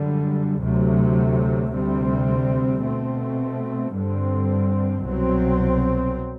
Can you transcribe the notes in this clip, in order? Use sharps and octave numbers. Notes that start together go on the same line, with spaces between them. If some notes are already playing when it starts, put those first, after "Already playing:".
Already playing: F#2 D3 G3
D2 C3 F#3 A3
D2 C3 G3 C4
B2 A3 C4
G2 D3 G3 C4
C2 B2 F#3 C4